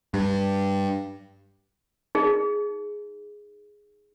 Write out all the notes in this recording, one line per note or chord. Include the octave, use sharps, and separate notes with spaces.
G2
D#4 G#4